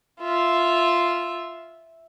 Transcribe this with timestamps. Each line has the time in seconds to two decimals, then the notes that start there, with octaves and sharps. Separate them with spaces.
0.20 F4 E5